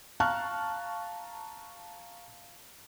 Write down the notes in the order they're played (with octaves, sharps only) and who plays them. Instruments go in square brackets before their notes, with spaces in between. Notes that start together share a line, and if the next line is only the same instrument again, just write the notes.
[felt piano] F5 A5 A#5 C#6 F6 F#6